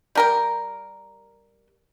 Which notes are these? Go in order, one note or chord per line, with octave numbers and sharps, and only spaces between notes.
G3 A#4 G5